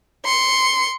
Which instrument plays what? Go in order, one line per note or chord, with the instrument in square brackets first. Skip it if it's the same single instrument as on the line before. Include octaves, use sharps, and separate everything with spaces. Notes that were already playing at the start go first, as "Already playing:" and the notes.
[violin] C6 C#7